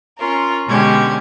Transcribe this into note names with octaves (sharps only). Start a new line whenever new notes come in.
C#4 F4 A#4
B2 D3 G#3 C#4 G4 G#6